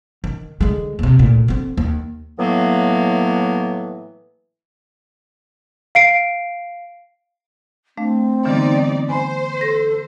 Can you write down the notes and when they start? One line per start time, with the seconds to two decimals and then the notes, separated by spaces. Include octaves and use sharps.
0.24 D#3
0.61 D3 G#3
0.99 D#2 C3
1.19 D2 A#2
1.48 D3 C4
1.77 D#2
2.39 A2 E3 F#3 A#3 B3
5.95 F5 C7 D7
7.97 A3 C4 D4 F5
8.45 D3 E3 G3 B3 D#4 D5
9.09 C5 G#5 B5 C6
9.61 A4 A#6